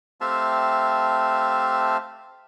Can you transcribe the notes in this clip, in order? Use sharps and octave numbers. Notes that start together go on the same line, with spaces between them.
A3 C4 G4 E5 F5 A5